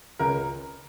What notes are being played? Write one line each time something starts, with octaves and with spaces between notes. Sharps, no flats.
C#2 A#4